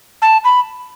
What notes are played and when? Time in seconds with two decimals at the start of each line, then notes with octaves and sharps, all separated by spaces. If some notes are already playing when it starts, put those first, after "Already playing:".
0.22 A5
0.44 B5